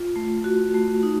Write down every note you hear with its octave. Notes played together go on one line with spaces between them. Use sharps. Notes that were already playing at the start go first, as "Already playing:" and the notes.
Already playing: F4
A3
F#4
A3
D#4